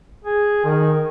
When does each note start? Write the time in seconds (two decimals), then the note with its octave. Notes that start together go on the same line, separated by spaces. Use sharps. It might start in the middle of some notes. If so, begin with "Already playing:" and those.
0.24 G#4
0.65 D#3